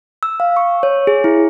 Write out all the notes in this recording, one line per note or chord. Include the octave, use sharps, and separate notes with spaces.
E6
F5
C#6
C#5
G#4
E4